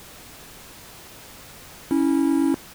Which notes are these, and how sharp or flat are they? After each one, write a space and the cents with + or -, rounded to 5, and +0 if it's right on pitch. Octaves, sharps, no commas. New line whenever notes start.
C#4 +0 E4 -20